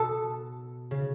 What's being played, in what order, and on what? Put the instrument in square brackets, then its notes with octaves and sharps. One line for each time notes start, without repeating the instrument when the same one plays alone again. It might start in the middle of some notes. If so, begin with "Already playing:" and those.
Already playing: [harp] B2 [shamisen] A4
[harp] C#3